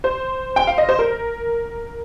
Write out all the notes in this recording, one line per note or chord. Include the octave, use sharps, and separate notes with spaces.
C5
G5
F5
D#5
C5
A#4